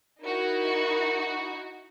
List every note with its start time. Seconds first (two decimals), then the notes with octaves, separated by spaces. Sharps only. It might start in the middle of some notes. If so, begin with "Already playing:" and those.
0.22 D#4 E4 F#4 A#4